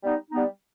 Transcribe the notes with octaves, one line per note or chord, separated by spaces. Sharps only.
G3 B3 D#4
G3 B3 D#4